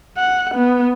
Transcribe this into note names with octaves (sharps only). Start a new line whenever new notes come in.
F#5
B3